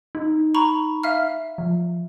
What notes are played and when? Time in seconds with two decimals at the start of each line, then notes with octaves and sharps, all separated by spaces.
0.15 D#4
0.55 A#5 B5 C#6
1.03 E5 F5 F6
1.58 F3